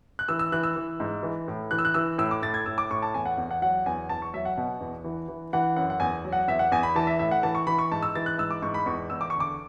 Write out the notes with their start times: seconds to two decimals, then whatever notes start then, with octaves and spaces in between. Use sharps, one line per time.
0.19 F#6
0.29 E3 E6
0.39 E6
0.52 E3 F#6
0.63 E6
0.76 E3
1.00 G#2
1.23 E3
1.48 A2
1.71 E3 F#6
1.79 E6
1.85 F#6
1.94 E3 E6
2.18 A2 E6
2.31 D6
2.42 A2 A6
2.54 G#6
2.66 A2 E6
2.78 D6
2.91 A2 C#6
3.02 A5
3.14 E2 G#5
3.26 F#5
3.37 E2
3.51 F#5
3.62 F#3 F#5
3.86 E2 G#5
4.09 E2 A5
4.22 C#6
4.34 F#3 E5
4.45 F#5
4.57 B2
4.80 E2
5.04 E3
5.28 E3
5.53 E3 F#5
5.76 F#2 F#5
5.90 F#5
6.00 E2 G#5
6.25 F#3
6.32 F#5
6.48 E2 E5
6.59 F#5
6.72 E2 G#5
6.83 B5
6.96 E3 A5
7.07 E5
7.19 A2 E5
7.31 F#5
7.43 E3 A5
7.55 C#6
7.67 E3 B5
7.79 C#6
7.92 G#2 A5
8.03 E6
8.15 E3 A6
8.26 F#6
8.39 G#2 E6
8.51 D6
8.62 G#2 C#6
8.74 B5
8.86 E2 C#6
9.10 E2 E6
9.21 D6
9.30 D3 C#6
9.40 D6